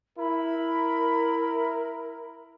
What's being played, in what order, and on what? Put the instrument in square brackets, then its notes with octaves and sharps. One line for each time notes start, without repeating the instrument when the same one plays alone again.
[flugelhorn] E4 [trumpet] A#4 [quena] B5